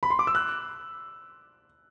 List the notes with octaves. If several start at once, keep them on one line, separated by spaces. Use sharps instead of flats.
B5
C6
D6
E6
F#6